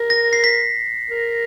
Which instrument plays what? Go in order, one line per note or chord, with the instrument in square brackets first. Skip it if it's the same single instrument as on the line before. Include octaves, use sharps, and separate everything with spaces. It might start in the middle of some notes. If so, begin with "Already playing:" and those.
Already playing: [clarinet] A#4
[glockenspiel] A#6
C7
B6
[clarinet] A#4